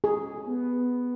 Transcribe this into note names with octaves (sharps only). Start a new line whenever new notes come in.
G#4
B3